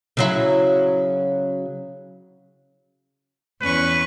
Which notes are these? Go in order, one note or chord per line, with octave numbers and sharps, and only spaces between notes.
C#3 F#3 E4
E2 C#4 B4 C#6